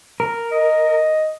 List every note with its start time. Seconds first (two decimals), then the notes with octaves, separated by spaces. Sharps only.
0.20 A#4
0.52 D#5